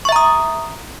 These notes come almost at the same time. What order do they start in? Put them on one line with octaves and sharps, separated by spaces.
C#6 E5 A#5 D#6